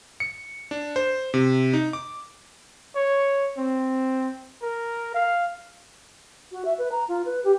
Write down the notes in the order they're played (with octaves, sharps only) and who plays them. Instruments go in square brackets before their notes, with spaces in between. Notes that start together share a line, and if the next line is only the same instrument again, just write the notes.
[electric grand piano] C#7
D4
C5
C3
D#4
D6
[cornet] C#5
C4
A#4
F5
[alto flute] F#4
E5
B4
A#5
F4
B4
G4